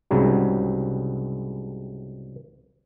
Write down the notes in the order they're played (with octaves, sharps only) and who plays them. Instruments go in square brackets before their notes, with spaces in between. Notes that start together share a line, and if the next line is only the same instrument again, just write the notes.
[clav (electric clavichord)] C2 G#2 C#3 F#3 G3